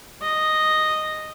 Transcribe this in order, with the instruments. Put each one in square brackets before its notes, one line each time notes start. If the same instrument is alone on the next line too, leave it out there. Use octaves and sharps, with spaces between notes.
[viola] D#5